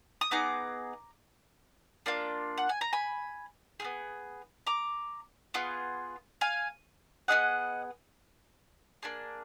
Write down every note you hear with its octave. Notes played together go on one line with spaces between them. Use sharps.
D#6
B3 D#4 G#4 A#5 D6
A#3 D4 F4
F#5
G#5
A#5
G#5 B5
B3 F4 G#4
A#5 D6
B3 F4 G#4
F5 G#5
B3 D4 G#4 D#5 F#5
A#3 D4 G#4